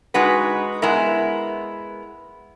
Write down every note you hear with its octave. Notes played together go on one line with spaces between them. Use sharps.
G#3 D#4 F#4 B4
G#3 B3 E4 A#4